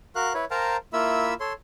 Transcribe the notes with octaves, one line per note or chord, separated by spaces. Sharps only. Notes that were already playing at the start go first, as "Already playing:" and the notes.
F#4 A#4 F5 F#6
E4 B4 C#5
A#4 C5 F5 G5 A5 A#5
A#3 E4 F4 E5 B5 E6
A4 C#5 C6